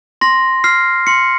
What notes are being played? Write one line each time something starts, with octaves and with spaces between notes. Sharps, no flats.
C6 A#6
F6 C7
C6 C#7